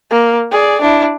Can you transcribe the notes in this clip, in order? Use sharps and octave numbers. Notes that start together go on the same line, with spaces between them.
A#3
G#4 D5
D4 E4